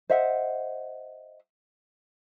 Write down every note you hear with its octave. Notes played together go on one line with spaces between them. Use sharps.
C5 D#5 E5 F#5